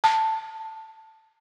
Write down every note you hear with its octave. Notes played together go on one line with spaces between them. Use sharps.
A5